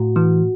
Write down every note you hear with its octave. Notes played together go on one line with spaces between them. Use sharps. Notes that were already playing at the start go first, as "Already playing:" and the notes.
Already playing: A2 F#4
E3